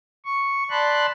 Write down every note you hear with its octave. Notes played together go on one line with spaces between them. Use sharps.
C#6
D5 A5 B5 C6 F#6